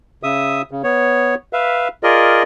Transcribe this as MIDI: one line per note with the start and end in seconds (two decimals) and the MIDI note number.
0.23 0.62 49
0.23 0.62 76
0.23 0.62 87
0.71 0.82 49
0.84 1.35 59
0.84 1.35 73
1.53 1.88 71
1.53 1.88 76
1.53 1.88 77
2.03 2.43 65
2.03 2.43 68
2.03 2.43 70
2.03 2.43 74
2.03 2.43 75